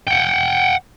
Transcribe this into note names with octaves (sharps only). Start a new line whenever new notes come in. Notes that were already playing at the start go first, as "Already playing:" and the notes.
F#5 G5